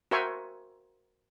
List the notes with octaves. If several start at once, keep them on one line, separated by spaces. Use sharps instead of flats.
F#4 A#4 C5 E5 G#5 C#6